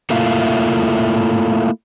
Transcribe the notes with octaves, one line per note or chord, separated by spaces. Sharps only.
A3 A#3 E4 F4